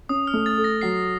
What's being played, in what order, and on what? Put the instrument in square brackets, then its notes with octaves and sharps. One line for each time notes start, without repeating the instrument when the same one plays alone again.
[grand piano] C#4 [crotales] D#6
[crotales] F6
[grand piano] A3
[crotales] A6
[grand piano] A4
[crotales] A#6
[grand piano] F#3 [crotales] C7